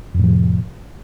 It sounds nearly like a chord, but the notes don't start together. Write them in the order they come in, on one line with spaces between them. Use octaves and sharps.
F2 A2 F3 C3